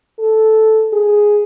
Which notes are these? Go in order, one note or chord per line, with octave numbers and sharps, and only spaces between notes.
A4
G#4